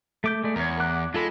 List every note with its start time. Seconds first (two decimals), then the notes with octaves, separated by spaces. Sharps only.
0.24 A3 D6 G6
0.44 G#3 A3 D5
0.56 E2 A#4 C#5
0.80 F#5 D6 F#6
1.14 G#3 F4 A4 B5